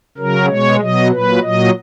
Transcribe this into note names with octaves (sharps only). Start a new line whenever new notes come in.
C#3 F#3 A#4
B2 G#3 C#5
B2 F#3 D#5
A#2 F#3 B4
A#2 F#3 D#5